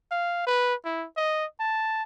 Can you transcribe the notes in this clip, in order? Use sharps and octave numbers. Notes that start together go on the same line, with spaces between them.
F5
B4
E4
D#5
A5